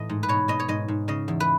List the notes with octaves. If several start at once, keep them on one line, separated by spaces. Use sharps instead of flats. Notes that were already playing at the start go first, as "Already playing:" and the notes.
Already playing: A2 E3 D#5
G#2
B4
B2 C#5
B2 D#5
C#5
G#2 D#5
G#2
C#3 D#5
E2
B4